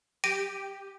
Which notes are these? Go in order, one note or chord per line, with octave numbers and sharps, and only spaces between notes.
G4 A#6 D7 D#7